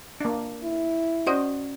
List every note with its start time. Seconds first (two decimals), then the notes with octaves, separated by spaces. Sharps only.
0.20 A#3 D4
0.63 E4
1.27 C#4 F#4 C5 D5 D#5 D#6